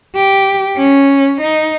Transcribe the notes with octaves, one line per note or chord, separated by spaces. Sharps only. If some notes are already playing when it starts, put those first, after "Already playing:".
G4
C#4
D#4